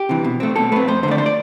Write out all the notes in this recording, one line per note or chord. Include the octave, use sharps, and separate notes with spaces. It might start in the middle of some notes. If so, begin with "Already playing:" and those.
Already playing: G4
C3 E3
B2
A3 C4
B2 A4
A3 C4 B4
F2 C5
D3 A3 C5 D5
C5
D5